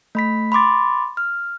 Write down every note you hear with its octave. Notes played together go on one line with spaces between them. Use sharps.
A3 B5 B6
B5 C6 D6 A6
F6